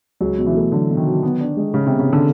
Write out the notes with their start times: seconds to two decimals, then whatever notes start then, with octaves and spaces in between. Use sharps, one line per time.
0.21 C#2 F#3
0.38 B2
0.46 E3
0.55 A3
0.72 D3 F#3
0.89 B2
0.97 D#3
1.06 F#3
1.23 B3
1.40 D4
1.57 G#3
1.74 C#3 G#3
1.87 C3
1.91 B3
1.99 C#3
2.09 D3 B3